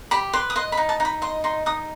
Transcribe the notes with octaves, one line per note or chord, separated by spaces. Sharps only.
G4 B5
B4 C6
D#6
D#5 C6
B5
D#4
A5
D#4
B5
D#5 C6
D#4 C6
D#4 D#6